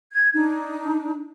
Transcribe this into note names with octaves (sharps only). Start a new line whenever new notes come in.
G#6
D4 D#4